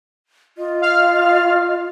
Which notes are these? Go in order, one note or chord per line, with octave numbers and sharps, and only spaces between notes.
F4 D#5
F5 F6